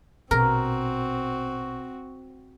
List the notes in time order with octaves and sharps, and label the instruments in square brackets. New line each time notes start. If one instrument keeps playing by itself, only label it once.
[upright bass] A#1 B2 [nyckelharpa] C4 F#4 [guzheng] A#4